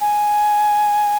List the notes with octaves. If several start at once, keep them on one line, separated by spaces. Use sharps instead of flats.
G#5